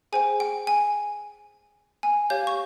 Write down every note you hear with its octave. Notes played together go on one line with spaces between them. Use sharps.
G#4 C5 G5 G#5
G5
G#5
G#5
G4 C#5 F5 G6
C#6